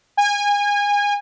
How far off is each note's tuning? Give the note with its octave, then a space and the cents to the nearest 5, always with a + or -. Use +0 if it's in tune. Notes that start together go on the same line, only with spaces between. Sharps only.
G#5 -25